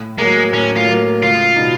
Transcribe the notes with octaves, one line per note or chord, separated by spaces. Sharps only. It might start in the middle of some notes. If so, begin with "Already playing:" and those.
Already playing: A2
F#3 G#3 A#3
A2 C#4
F4
F#3 A#3
C#2 F4
B2 G3 B3 D#4